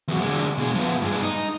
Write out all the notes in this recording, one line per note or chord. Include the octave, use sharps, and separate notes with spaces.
E2 F#3
D3 G#3
B2 G#3
F3 B3
G2 G#3
D#4